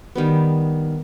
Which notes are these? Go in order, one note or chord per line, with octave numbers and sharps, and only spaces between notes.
D#3 G3 B3